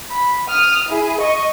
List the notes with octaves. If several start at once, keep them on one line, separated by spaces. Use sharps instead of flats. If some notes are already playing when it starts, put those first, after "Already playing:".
B5
D#6 F6
E4 G#4
D#5 C#6